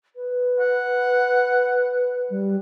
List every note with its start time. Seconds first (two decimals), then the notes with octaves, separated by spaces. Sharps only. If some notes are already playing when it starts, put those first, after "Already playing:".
0.16 B4
0.59 F#5
2.30 G3